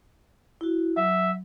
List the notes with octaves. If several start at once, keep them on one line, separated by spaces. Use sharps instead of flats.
E4 F#4
F#3 E5